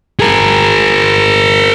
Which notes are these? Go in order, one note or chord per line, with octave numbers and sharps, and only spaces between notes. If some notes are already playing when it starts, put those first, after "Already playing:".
G#4 A#4